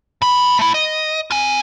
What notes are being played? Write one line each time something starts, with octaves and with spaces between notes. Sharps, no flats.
G#2 B5
A3 E4
D#5
F4 G#5